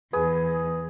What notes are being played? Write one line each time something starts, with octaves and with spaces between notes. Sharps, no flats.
E2 G#4 B4